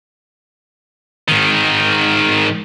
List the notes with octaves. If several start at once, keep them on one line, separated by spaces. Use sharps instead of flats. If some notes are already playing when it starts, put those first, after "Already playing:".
G#2 D#3